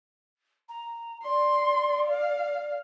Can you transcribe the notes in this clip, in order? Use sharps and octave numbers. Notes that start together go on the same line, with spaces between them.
A#5
D5 C6
F5